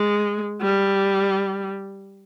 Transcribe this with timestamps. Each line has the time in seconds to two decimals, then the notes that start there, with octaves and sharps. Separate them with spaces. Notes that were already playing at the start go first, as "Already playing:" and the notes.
Already playing: G#3
0.61 G3